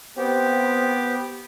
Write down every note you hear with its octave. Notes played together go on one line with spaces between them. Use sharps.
B3 C4 G4